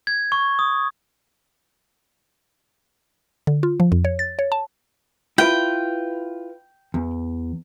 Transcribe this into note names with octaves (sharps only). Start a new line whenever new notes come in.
G#6
C#6
D#6
D3
F4
F3
F2
C#5
A6
C#5
A5
E4 F4 B4 G5
E2